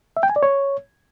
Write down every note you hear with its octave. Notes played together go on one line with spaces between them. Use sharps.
E5
G5
G#5
D5
C#5